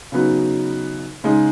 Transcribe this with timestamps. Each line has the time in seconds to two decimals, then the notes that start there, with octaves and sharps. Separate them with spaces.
0.12 C#3 F#3 B3 D#4
1.24 C#3 G#3 D#4